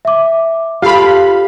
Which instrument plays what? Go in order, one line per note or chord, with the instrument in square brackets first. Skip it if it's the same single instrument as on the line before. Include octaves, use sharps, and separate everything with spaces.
[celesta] E5 D6
[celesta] F4 [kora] G4 A4 C5 [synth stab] F5 B5